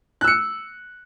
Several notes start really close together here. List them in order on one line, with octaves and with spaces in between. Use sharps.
F#6 E6 C#7